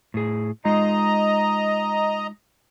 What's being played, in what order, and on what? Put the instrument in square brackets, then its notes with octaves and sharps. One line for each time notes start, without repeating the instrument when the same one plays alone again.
[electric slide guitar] A2 G#4
[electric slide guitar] G#3 D#4 F4 [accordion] D#5 A#5